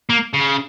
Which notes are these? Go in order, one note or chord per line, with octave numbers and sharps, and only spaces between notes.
A#3
C#3